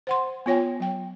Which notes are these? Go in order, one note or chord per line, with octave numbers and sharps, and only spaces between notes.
C5 F#5 C6
B3 F4 C#5 G5 G#5
F#3 G5